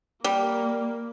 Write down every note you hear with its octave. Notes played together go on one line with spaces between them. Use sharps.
G3 A#3